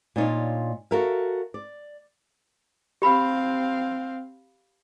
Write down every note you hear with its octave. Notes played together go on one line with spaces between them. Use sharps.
A#2 D4 D#4 F4 C#5
F#4 A4 A#4 E5 F5
D5
C4 G4 F5 B5